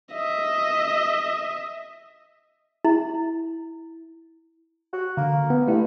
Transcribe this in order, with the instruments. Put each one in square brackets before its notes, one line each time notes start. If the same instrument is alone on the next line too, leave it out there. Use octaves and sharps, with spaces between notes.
[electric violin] D#5 E5
[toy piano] E4
[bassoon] F#4
[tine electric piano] D3 [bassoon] A#3
[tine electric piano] B3
[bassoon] G2 [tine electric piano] A3 E4